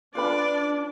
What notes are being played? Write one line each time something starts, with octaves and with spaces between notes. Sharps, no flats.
D4 F4 B4 D5 B5